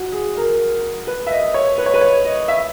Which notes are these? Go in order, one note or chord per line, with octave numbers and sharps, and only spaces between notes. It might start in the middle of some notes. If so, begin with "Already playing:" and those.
Already playing: F#4
G#4
A#4
B4
E5
D#5
C#5
B4
C#5
B4
C#5
D#5
E5